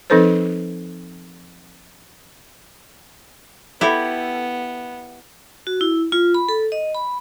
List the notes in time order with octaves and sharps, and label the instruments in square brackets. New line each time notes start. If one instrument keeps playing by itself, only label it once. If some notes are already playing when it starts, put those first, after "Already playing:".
[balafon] F3 C4 D#4 A4 B4 C5
[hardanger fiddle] B3 [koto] E4 G4 A4
[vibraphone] F#4
E4
F4
B5
A4
D#5
B5